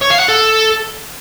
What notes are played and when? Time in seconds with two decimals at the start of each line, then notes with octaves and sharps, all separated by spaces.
0.01 C#5
0.10 F5
0.19 F#5
0.28 A4